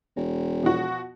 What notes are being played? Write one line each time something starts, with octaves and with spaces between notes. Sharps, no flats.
E1
B2 F3 F#4